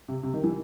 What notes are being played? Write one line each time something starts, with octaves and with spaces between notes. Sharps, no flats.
C3
C3
D#3
E3